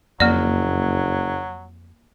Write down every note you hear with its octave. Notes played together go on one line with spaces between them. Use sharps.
F#1 F2 F#3 A#3 D5